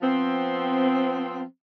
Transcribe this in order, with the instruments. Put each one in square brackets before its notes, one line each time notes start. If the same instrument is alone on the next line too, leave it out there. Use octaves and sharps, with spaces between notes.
[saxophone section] F3 B3 C4